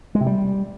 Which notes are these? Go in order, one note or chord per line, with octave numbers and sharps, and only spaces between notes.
G#3
C3
G3